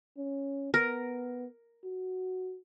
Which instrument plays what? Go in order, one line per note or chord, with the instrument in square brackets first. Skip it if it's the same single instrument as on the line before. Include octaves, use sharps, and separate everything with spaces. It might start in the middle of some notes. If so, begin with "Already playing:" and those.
[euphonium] C#4
[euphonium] B3 [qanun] A#4
[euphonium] F#4